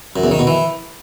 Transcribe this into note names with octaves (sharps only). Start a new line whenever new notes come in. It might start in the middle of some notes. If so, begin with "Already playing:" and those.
F#2
E2
D#3
B2
E3